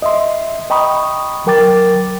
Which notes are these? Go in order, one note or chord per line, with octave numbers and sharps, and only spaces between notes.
D#5 E5 C6
D#5 G5 A#5 B5 C#6 D#6
F#3 A#4 G5 D6 A6